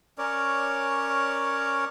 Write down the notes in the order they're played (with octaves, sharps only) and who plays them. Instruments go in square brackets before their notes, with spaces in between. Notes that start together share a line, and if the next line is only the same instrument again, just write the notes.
[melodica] C#4 A#4 C#5 D5